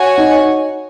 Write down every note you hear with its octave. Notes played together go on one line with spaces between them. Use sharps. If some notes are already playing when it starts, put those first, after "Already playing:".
Already playing: F#4 C#5 G#5
D#4